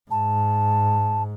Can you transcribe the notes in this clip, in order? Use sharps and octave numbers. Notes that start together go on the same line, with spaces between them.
G#2 A5